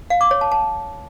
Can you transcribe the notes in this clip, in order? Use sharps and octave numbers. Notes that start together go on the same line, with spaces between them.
F5
D6
C#5
A5
A5